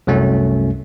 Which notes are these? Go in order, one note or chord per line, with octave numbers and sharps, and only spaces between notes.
C2 F#2 F#3 A3 C#4